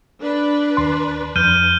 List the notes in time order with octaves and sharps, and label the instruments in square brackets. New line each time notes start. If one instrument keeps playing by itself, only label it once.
[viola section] D4 B4
[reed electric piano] D#2 C6
[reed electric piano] F2 [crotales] F6 G6 D#7